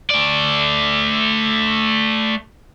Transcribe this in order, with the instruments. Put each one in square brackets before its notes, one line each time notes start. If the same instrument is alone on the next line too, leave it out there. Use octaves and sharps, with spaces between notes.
[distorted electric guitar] A3 D5